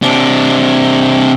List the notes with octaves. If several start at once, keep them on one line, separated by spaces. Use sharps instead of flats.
C3 D4